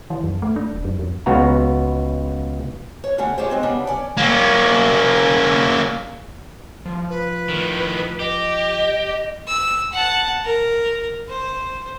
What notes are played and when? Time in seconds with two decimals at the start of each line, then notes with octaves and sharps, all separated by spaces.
0.10 E3
0.24 F#2
0.42 A3
0.56 D4
0.73 D#1
0.85 F#2
0.99 F2
1.26 C#2 B3 F#4 F5 A#5
3.04 C#5
3.18 D3 G3 A3 C#4 F#5
3.38 F4 G4 G#4 C5 C#5
3.50 G#3 C4 D#4
3.63 C#3 G3 B3 D4
3.87 C#4 D5
4.17 A#3 C#4
6.86 F3
7.10 B4
7.49 A2 D#3
8.19 G4 D#5
9.48 E6
9.93 F#5 A5
10.44 A#4
11.29 C5